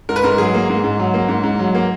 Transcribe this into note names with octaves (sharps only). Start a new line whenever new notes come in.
G#2 A#4
B4
G#2 A#4
F#3 G#4
A#3
G#2
G#2
F#3
A#3
G#2
G#2
F#3
A#3